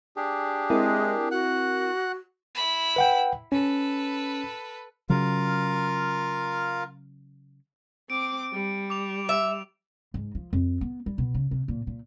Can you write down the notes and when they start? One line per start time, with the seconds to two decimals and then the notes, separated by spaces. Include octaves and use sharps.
0.17 D4 G4 G#4
0.70 G#3 C4 E4 A#4
1.31 F#4 F#5 F#6
2.54 E4 B5
2.96 B4 F#5 G5
3.52 C#4 A4 B4
5.10 C#3 F#3 F4 A#4 F5
8.10 C4 D6 D7
8.53 G3
8.90 D6 F7
9.29 E5
10.14 G#2
10.35 F3
10.53 F2
10.81 B3
11.06 G3
11.18 B2
11.34 C#3
11.51 C3
11.68 A#2
11.87 A#2